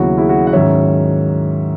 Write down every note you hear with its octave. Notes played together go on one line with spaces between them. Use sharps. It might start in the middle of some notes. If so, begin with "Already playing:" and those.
Already playing: D#2 C#3 F#3 B3 E4 F#4
E4 G#4
F#4
F#5
G#2 D#3 F#3 C#4 C#5 E5